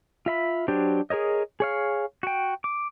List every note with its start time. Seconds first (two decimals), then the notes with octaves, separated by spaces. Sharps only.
0.26 F4 E5 B5
0.68 F#3 D4 G4 C5
1.10 G#4 A#4 C#5 D#5
1.60 G#4 C#5 F5
2.23 F#4 G5
2.64 D6